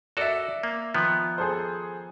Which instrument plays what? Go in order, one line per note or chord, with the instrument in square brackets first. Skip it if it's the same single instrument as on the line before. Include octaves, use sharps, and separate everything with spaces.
[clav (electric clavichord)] F#4 A4 A#4 [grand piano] D5 E5
[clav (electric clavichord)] A#3
D#3 F3 B3
[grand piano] G#4 A4 C5